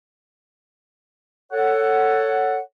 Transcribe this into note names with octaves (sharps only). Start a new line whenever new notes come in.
A4 C#5 F#5